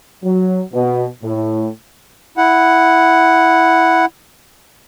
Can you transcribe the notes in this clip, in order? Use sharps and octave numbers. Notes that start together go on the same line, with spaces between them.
F#3
B2
A2
E4 F#5